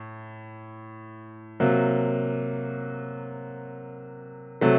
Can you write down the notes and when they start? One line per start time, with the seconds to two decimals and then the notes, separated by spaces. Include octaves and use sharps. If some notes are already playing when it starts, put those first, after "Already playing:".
Already playing: A2
1.60 C3 F#3 A#3
4.61 C3 F#3 A3